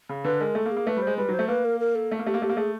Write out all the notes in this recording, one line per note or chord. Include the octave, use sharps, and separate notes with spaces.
C#3
D3 B4
G#3 A#4
A3 A4
A#3
G#4
A#3
A3 B4
G3
G#3 C5
G3 B4
F#3
C5
A3
A#3 B4
A#4
A#4
A4
A3
A#3
A3 G4
A#3
A3 G4
A#3
A3 G#4